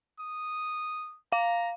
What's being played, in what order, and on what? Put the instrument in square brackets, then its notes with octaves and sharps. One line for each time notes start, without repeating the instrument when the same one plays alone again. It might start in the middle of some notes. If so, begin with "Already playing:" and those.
[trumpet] D#6
[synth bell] F5 [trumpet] A#5